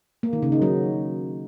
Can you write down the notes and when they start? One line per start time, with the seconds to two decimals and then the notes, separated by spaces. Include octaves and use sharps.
0.23 A#3
0.33 D#3
0.42 C#3
0.52 D#4
0.62 F#3